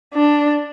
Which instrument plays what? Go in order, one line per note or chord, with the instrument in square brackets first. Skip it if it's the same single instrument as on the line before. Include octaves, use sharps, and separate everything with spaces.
[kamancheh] D4